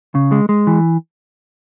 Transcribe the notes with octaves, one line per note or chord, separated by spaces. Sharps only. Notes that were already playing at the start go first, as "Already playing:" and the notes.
C#3
G#3
G#3
E3